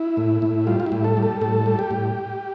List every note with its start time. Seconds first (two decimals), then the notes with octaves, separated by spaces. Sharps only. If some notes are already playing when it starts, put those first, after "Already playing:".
Already playing: E4
0.17 A2
0.42 A2
0.67 G3 F4
0.80 F4
0.86 E4
0.92 A2
1.04 A4
1.17 G3
1.23 A4
1.41 A2 A4
1.66 G3
1.79 G4
1.91 A2